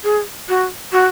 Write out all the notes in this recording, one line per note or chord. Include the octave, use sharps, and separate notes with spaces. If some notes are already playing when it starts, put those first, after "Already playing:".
G#4
F#4
F#4